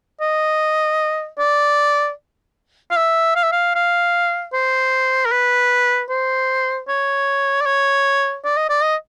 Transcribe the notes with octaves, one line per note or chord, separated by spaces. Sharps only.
D#5
D5
F5
E5
F5
E5
F5
F5
C5
A#4
B4
C5
C#5
D5
C#5
D5
D#5
D5
D#5